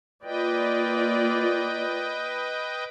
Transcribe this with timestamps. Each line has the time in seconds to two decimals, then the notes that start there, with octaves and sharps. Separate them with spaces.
0.23 A#3 F4 B4 D5 D#5 G5